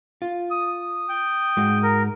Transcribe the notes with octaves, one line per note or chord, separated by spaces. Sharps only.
F4
D#6
G5
G#2 G#3 F#4
A#4